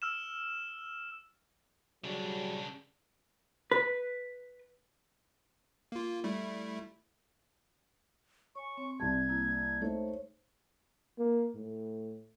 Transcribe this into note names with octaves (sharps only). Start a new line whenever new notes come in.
E6 F6 E7
C#3 F#3 G3 D4 G#4
B4
A#3 F4
G3 A3 E4
C#5 G#5 C#6
C4
C2 G3 A5 G#6
A#3 E4
A3 D#4 C5 C#5
A#3
A2